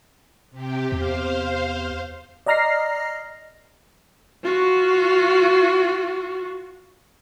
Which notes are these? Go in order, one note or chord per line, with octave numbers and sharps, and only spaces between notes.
C3 G4
E2 C5 F5
D5 D#5 A#5 F6 A#6 C7
F4 F#4